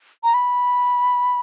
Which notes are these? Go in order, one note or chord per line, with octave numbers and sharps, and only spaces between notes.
A#5
B5